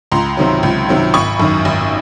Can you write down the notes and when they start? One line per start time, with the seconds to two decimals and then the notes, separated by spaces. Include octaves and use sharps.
0.12 C#2 A#5 C6
0.37 C3 D#3 F#3
0.63 C#2
0.89 C3 D#3 F#3
1.14 G#1 B5 C#6
1.39 F#2 D#3
1.65 G#1